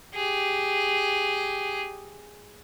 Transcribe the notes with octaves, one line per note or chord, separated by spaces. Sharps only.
G4 G#4